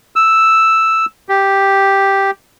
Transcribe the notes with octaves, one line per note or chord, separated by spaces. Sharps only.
E6
G4